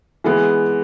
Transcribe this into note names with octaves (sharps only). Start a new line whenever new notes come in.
E3 G#3 B3